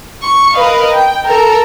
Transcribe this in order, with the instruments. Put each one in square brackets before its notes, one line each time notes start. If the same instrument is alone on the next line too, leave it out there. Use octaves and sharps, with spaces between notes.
[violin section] C#6
A#4 B4 D#5 F5
G5
A4 A#4 A#5